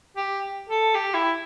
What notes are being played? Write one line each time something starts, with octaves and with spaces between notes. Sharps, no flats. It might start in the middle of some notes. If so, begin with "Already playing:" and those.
G4
A4
G4
E4